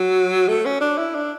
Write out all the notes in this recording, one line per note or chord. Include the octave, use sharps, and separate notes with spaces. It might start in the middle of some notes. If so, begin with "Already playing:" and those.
Already playing: F#3
A3
C#4
D4
E4
D4